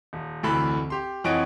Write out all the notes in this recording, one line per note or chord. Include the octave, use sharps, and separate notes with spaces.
D#1
F1 D2 E3 A4 B5
G4 C6
F2 E3 C#5 D#5 F#5 D7